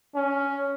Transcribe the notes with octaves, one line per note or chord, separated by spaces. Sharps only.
C#4